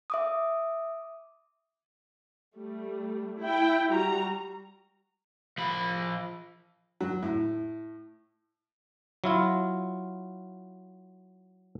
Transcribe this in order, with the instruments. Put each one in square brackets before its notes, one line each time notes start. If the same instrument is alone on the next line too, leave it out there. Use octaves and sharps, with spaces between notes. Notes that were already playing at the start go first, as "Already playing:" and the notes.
[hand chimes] E5 D6 D#6
[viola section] G3 A3
E4 G5
G3 F#4 A#5
[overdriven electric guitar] F3 B5
[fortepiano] F#3
A2
[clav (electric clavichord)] F#3 E4 F4